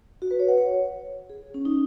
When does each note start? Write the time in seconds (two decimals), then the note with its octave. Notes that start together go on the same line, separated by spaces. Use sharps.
0.22 F#4
0.31 B4
0.39 C#5
0.48 F#5
0.58 C#5
1.30 G#4
1.54 C#4
1.65 D#4